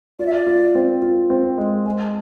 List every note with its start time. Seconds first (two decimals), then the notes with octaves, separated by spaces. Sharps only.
0.19 F4 D5
0.26 E5
0.34 D5
0.47 F4
0.75 C4
1.02 F4
1.30 C4
1.58 G#3
1.86 G#3 G#5
2.01 A5